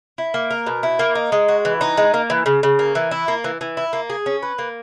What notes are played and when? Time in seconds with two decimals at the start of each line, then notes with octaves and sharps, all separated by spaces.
0.18 E4
0.34 A#3
0.50 A#4
0.67 B2
0.83 E4
0.99 A#3
1.15 D#4
1.32 G#3
1.48 F#4
1.65 E3
1.81 D#4
1.97 G#3
2.14 A#3
2.30 E3
2.46 C#3
2.63 C#3
2.79 A#3
2.95 E3
3.11 E4
3.28 A#3
3.44 E3
3.61 E3
3.77 E4
3.93 A#3
4.10 G#4
4.26 C#4
4.42 B4
4.59 A#3